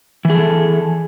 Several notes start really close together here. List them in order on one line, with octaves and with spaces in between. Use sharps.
E3 G#4 A4